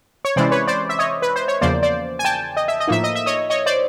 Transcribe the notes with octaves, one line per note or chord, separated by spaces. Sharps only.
C#5
C3 E3 G#3 C#4 E4 C5 D5
B4 C#5
C5 D5
E5
C#5 D#5
B4
C5
C#5
E2 C#3 F3 A#3 C5 D5
C5 D5
G#5
G5 A5
D#5
E5
D#5
A2 F3 A#3 D#4 E5
D#5
E5
C#5 D#5
C#5 D#5
C5 D5